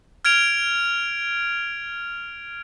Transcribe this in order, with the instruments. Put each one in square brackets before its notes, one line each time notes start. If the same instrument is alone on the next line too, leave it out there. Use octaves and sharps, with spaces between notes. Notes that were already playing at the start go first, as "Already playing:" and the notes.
[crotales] F6 G#6 D7 F7